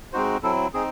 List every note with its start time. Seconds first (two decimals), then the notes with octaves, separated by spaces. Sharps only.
0.13 G#3 C4 D#4 F#4 C5
0.43 F#3 C4 E4 A4
0.74 C4 D#4 G#4